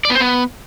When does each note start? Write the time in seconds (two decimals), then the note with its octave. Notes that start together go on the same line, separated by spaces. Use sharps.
0.05 D5
0.10 B3
0.15 C5
0.20 B3